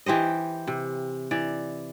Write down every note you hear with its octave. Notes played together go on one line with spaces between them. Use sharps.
E3 G4 C5 D#5
C3
E3 D5